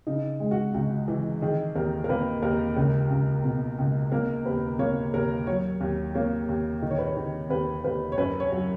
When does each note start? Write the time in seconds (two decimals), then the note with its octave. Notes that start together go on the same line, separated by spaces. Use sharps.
0.07 C#3 D#4
0.40 G#3
0.51 F#4
0.74 C#2 F#4
1.08 E3
1.42 D#3 G#4
1.75 D#2 A#4
2.04 A#4
2.09 A#3 B4
2.43 D#2 A#4
2.76 C#2 A#4
3.10 C#2
3.44 B2
3.78 C#2
4.12 A#3 A#4
4.45 D#2 B4
4.79 A#3 C#5
5.14 D#2 A#4
5.47 F#3 C#5
5.81 D#2
6.14 A#3 C#5
6.49 D#2
6.82 D#3
6.90 C#5
6.98 B4
7.05 C#5
7.16 D#3
7.50 D#2 B4
7.84 D#2 B4
8.12 C#5
8.18 F#2 B4
8.40 C#5
8.52 F#3